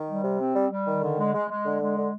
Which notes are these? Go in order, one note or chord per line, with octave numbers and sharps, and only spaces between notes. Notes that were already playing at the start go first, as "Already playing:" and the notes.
Already playing: D#3
G3
C3
C4
G3
G3
D#3
D3
G#3
G#3
G#3
D3
G#3
D3